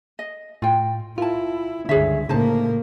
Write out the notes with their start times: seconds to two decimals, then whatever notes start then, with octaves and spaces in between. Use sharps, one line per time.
0.19 D#5
0.62 A2 F4 G5
1.18 E4 F4 A#4 A5
1.89 C#2 G2 D3 G#4 C#5 E5
2.29 A2 C#3 A#3 D#4 C5 A5